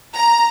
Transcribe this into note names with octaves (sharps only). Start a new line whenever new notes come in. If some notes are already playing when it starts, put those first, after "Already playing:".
A#5